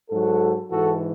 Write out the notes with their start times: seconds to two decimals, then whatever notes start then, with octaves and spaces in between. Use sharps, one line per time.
0.10 G#2 F#3 F#4 A4
0.71 G#2 E3 F#4 A4